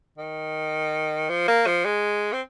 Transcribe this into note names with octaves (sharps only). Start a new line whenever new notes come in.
D#3
F3
A#3
F3
G#3
C4